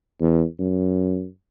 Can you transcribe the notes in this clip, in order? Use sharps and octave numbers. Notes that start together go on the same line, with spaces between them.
E2
F#2